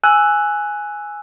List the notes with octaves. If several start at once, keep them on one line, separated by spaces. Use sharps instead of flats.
G#5 E6 F#6